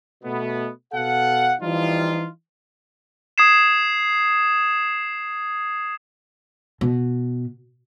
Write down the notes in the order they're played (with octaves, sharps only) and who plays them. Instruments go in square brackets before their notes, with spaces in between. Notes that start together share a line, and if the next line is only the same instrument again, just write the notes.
[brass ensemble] B2 A3 B3
B2 A4 F5 F#5
E3 F3 G3 D#4 F4
[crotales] D#6 G#6 C7 E7
[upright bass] B2